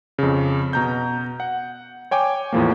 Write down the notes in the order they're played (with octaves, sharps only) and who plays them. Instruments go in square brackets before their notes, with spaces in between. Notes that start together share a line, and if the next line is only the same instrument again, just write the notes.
[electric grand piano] F2 C#3
B2 A#5 G6
F#5
C#5 G5 G#5 D6
E2 A2 F3 A#3